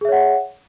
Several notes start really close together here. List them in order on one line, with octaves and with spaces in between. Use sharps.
G#4 E5 C#5 F#5